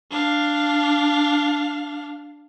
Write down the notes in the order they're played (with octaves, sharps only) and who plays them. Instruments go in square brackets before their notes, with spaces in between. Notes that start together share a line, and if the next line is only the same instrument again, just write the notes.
[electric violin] D4 F5